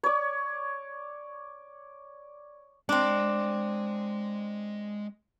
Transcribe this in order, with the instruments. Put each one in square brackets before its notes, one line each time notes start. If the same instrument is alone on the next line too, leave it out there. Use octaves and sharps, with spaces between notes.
[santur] C#5 D5
[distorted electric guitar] G#3 C6 [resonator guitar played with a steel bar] C4 D4